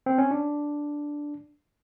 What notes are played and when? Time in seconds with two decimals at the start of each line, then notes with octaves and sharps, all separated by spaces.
0.06 C4
0.18 C#4
0.31 D4